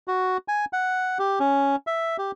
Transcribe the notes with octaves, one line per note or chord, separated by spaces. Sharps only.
F#4
G#5
F#5
G4
C#4
E5
G4